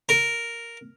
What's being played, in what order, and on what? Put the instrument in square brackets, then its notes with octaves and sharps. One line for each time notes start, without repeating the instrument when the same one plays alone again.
[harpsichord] A#4